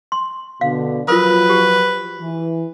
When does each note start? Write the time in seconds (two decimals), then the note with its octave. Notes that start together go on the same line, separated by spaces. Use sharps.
0.12 C6
0.61 B2 D3 F5
1.08 F3 F#3 F4 A#4 B4 D#6
1.49 G4
2.20 E3